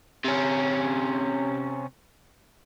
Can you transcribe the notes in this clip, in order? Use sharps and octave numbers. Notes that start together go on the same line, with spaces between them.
C3 C#4